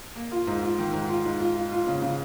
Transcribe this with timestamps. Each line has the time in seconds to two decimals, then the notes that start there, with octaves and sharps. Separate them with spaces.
0.16 A#3
0.31 F4
0.47 G#2
0.63 F4
0.78 D#3
0.93 G#2
1.09 F4
1.25 G#2
1.40 F4
1.56 F4
1.71 F4
1.87 C#3
2.02 C#3